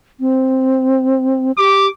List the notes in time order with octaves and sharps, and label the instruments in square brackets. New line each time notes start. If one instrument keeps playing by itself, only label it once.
[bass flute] C4
[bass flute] G4 [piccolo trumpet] D6